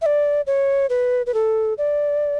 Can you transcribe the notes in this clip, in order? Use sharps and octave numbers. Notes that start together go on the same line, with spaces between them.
E5
D5
C#5
B4
B4
A4
D5